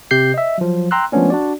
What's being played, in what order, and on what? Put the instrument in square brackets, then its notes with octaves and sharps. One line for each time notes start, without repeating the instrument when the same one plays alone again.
[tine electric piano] C3 G4 G6 C7
D#5 E5
F3 F#3
G5 A#5 C6 E6 F#6
F3 G#3 A3 B3 C#4 D4
D4 F#4 D5